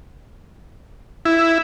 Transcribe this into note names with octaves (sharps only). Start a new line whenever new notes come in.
E4